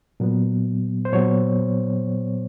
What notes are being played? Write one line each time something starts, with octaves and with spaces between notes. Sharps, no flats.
A#2 F#3 B3
C5
A#2 F#3 B3 C#5